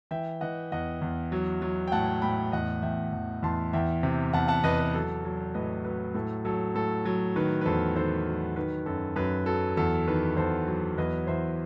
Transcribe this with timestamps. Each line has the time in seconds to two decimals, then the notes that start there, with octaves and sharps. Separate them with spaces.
0.11 E3 E5 G5
0.41 E3 D#5 F#5
0.72 E2 D#5 F#5
1.01 E2
1.32 F#3
1.62 F#3
1.88 G5
1.92 A2 F#5 A5
2.22 A2 G5 B5
2.52 E2 D#5 F#5
2.82 E2 E5 G5
3.12 E2
3.43 E2 A5 C6
3.73 E2 E5 G5
4.03 C3
4.33 E2 F#5 A5
4.48 F#5 A5
4.64 E2 B4 D#5
4.80 B4
4.94 F#3 A4
5.24 F#3
5.54 A2 B4 D#5
5.85 F#3 B4
6.14 A2 A4
6.45 F#3 A4
6.75 A2 A4
7.05 F#3
7.36 D#3 B4
7.61 B4
7.65 E2 A4 C5
7.96 D#3 A4 C5
8.27 F#3
8.56 D#3 B4
8.86 F#2 A4
9.16 F#2 B4
9.46 F#3 A4
9.77 E2 A4
10.07 D#3 B4
10.37 E2 A4 C5
10.67 F#3
10.97 E2 B4 D#5
11.27 E2 C5 E5